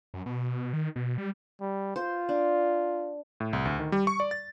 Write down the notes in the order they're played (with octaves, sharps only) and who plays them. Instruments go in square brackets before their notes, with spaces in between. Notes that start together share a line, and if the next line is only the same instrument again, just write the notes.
[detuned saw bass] F#2
B2
D#3
B2
G3
[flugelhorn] G3
[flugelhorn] F4 [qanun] C5
[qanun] D4
[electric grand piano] A2
C2
D2
D#3
G3
C#6
D5
A6